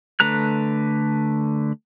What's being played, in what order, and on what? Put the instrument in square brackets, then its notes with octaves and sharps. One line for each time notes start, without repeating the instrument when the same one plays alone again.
[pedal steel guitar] D3 A3 B4 A#5 F#6